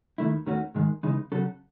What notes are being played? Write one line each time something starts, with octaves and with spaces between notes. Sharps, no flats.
D#2 D#3 A3 E4
D#2 D#3 A3 C#4 F#4
G#2 D#3 G#3
C#2 C#3 E3 G#3 D#4
C#3 F#3 C#4 F#4 A4